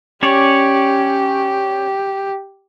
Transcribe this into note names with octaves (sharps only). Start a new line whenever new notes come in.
C#4 G4 C#5 D5